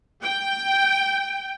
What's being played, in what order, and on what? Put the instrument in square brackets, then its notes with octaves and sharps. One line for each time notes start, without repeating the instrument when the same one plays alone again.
[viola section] G5